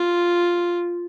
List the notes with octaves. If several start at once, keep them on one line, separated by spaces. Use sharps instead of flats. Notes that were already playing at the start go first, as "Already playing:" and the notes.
Already playing: F4